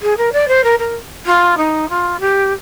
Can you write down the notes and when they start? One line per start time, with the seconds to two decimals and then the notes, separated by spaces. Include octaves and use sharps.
0.02 G#4
0.17 A#4
0.32 D5
0.48 C5
0.63 A#4
0.79 A#4
1.26 F4
1.57 D#4
1.89 F4
2.19 G4